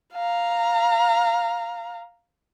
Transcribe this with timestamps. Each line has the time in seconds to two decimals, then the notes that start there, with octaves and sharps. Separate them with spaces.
0.14 F5 A#5